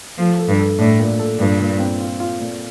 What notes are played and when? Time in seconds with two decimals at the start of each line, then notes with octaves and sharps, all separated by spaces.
0.18 F3 A3
0.39 A4
0.48 G2
0.59 A4
0.79 A2 D4
0.99 A#2
1.19 A4
1.39 G2 A#2
1.60 A#2
1.79 C4
2.00 F4
2.20 F4
2.40 A#2